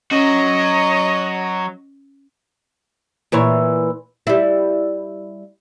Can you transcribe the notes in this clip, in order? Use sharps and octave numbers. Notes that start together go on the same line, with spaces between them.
F#3 C#4 F#4 C#5 D#5
A#2 E3 C#5
G3 E4